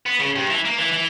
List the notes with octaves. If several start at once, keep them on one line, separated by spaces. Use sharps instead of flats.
B3
C#3
G2
E3
A#3
E3
E3